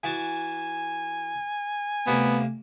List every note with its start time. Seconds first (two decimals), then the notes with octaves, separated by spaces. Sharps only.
0.04 E3 F#4 G#5 A5
2.07 D2 C3 A#3 B3